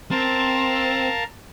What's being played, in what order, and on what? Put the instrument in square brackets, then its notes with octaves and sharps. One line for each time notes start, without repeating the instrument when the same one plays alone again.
[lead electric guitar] C4 [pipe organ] A#4 F5 A5